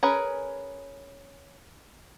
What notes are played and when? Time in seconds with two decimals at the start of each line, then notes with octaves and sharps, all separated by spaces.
0.03 C#4 G#4 A#4 B4